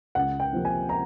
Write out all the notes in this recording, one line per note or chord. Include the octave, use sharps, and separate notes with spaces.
C#2 F#5
G5
C3 F3 A#3
G#5
A#5